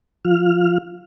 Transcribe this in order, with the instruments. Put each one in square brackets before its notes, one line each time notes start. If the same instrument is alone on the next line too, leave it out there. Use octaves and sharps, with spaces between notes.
[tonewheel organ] F3 F4 F6